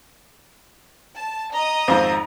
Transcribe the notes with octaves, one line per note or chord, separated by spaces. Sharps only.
A5
D#5 A#5 D#6
G#1 F2 C4 C5